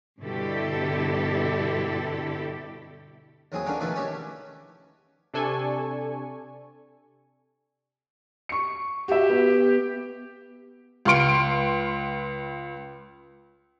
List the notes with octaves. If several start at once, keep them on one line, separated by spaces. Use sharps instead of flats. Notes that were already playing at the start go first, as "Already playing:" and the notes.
G2 B2 D3 E4 G4 A4
D#2 F#3 C4 G#4 D#6
D3 D#3 F#3 A#3 C#4 D4
F2 B2 D#3 A3 B4 E5
C#4 E4 F#4 G4 C#5
C3 D4 A4 G#5 C#6
C#6 C#7
F#4 G4 E5
B3
C#2 F5 C6 D7